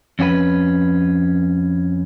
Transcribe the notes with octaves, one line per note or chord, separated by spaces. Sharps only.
F2 C#4 F#4 B4